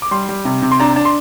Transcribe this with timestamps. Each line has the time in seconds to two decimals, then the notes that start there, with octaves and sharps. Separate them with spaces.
0.02 D6
0.11 G3 C6
0.29 G3
0.45 C3
0.62 C3
0.71 C6
0.79 D4 A#5
0.96 D4
1.05 C6